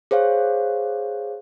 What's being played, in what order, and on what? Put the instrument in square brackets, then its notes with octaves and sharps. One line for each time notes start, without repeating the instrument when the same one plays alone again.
[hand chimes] G#4 C5 C#5 F5